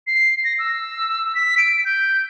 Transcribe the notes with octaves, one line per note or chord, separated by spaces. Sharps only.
C7
A#6
E6
B6
D7
G6